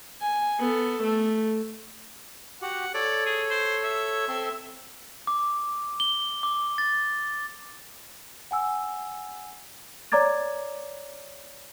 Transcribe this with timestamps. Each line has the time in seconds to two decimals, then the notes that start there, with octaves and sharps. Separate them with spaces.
0.21 G#5
0.59 B3 A4
1.03 A3
2.62 F#4 G4 F#5
2.94 A4 C#5 D5
3.26 G#4
3.50 C5
3.84 E5
4.28 C4 A4 C6
5.27 D6
6.00 G7
6.43 D6
6.78 A6
8.51 F#5 G#5 E6
10.12 C#5 D5 A#5 D6 G#6 A6